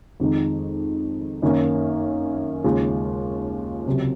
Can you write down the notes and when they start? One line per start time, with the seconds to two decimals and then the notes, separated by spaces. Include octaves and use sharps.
0.20 F2 D#3 G#3 D#4
1.42 F#2 D#3 A#3 C#4
2.64 D#2 C#3 G#3 C#4 F4
3.87 C#2 C3 F#3